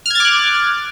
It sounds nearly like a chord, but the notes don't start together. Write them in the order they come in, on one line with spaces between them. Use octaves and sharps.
F6 G#6 A6 D6 F#6